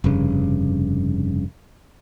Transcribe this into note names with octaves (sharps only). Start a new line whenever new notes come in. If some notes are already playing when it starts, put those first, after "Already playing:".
F1 G2 C#3